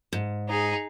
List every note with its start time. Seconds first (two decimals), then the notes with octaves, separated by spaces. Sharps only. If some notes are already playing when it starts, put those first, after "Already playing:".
0.13 G#2
0.49 D#4 G#4